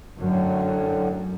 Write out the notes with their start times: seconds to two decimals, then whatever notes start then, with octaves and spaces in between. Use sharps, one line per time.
0.18 F#2 A2 D3